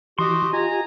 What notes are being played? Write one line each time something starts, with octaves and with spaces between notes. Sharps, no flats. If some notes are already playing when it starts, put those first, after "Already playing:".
E3 F#4 G4 D#5 C6
F4 G4 D#5 G#5 A#5